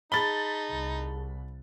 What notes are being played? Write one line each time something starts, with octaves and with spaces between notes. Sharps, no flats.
D#4 G#4 A5 B5 A6 G7
C2